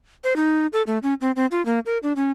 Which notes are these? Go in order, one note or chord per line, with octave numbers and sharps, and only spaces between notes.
C5
D#4
A4
A3
C#4
C4
C4
F4
A#3
A#4
D4
C#4